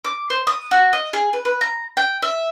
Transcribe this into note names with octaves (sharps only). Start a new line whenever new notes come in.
D6
C5
D#6
F#4
D#5
G#4
B4
B4
A#5
G5
E5